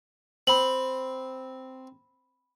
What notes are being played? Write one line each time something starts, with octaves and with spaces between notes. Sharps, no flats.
C4 B5 F#7